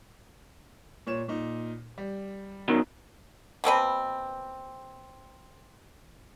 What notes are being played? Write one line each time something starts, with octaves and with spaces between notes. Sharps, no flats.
A#2 C#5 E7
A#2 D#4
G3
B2 D#3 F#3
B2 A#3 C4 B4